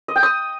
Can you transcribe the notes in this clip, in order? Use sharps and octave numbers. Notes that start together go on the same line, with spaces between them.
D#5
G5
D#6